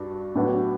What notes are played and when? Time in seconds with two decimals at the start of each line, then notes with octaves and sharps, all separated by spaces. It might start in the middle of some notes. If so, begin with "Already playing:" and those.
Already playing: G2 D4 F#4
0.35 A2 F#3 B3 D4 F#4